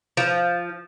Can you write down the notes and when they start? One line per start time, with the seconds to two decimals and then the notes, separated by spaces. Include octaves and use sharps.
0.17 F3